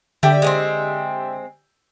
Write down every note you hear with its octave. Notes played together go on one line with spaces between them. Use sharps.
D3 G3 G4 D5 E5 G5
G#3 B3 C4